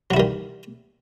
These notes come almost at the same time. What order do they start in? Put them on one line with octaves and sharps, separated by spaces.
F#3 E4 G3 D#3